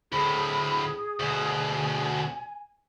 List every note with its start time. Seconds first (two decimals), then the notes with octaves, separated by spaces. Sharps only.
0.12 D2 A2 G#4 B5
1.20 D2 B2 G#5